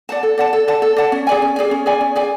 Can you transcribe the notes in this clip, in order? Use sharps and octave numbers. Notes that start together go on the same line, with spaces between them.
D5 F#5 A5
A4
D5 F#5 A5
A4
D5 F#5 A5
A4
D5 F#5 A5
C#4
G#4 D5 G#5
C#4
G#4 D5 G#5
C#4
G#4 D5 G#5
C#4
G#4 D5 G#5